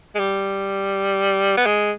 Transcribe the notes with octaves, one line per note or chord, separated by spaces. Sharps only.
G#3
G3
B3
G#3